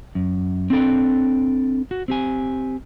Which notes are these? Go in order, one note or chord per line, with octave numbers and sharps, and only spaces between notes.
F#2
C4 D4 A4 G5
F#4
C4 G4 G#5